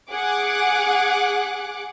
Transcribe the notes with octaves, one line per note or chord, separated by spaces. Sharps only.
G#4 F#5 D6 F#6